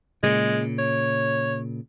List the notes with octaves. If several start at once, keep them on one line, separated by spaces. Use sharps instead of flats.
A#2 C#3 G#3
C#5